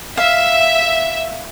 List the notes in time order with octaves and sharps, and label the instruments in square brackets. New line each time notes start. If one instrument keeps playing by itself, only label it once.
[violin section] E5 [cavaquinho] F5